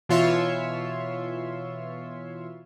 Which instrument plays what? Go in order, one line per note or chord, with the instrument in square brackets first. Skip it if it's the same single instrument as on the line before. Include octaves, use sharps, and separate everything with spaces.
[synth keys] B2 E3 F4 C#5 E5 C6